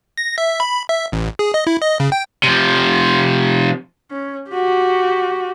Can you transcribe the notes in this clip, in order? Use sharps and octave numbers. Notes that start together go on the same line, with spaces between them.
A#6
E5
B5
E5
A1
G#4
D#5
E4
D#5
C#3
G5
C3 F3
C#4
F#4 G4